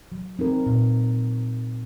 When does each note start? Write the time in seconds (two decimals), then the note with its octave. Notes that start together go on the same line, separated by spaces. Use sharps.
0.12 F#3
0.39 C4 D#4 A#4
0.66 A#2